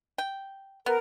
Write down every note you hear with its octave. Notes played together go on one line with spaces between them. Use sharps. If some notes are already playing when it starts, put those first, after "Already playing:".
G5
B3 A#4